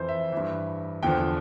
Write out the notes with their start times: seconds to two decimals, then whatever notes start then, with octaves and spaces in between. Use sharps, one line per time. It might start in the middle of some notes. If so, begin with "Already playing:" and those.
Already playing: F2 E3 C5
0.09 E5
0.32 G2 E3
1.03 E2 D3 F3 G5